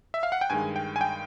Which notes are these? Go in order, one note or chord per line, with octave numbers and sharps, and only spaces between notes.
E5
F5
F#5
G5
G2 D#3 G#3 G#5
G5
G#5
G5